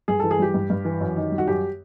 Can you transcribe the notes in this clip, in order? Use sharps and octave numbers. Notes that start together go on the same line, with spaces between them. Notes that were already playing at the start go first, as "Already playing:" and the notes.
G2 G#4
E3 A4
G#4
G3 G4
G2
G2
E3
F#2
D#3
G3
F#4
F#2 G4